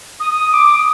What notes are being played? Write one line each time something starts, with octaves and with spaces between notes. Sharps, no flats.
D#6
D6
D#6